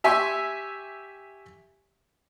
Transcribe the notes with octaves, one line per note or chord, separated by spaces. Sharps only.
G4 E5 G#5 C6 C#6 E6